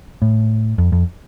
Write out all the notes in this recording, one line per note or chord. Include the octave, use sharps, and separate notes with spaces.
A2
F2
F2